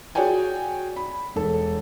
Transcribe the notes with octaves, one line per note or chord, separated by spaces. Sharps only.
F#4 G#4 C#5 D5 G5 G#5
B5
E1 A4